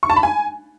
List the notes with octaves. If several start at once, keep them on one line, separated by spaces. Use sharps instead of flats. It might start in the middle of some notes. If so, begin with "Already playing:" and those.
C#6
A5
B5
G#5